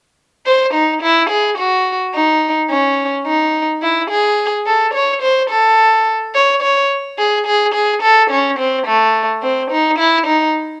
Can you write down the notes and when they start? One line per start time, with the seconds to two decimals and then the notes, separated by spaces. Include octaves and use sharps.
0.46 C5
0.74 D#4
1.02 E4
1.30 G#4
1.58 F#4
2.14 D#4
2.70 C#4
3.26 D#4
3.82 E4
4.10 G#4
4.67 A4
4.94 C#5
5.22 C5
5.50 A4
6.35 C#5
6.62 C#5
7.18 G#4
7.47 G#4
7.74 G#4
8.02 A4
8.30 C#4
8.59 C4
8.87 A3
9.43 C4
9.71 D#4
9.99 E4
10.27 D#4